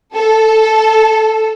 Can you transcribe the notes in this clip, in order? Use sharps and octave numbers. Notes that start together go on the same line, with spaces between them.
A4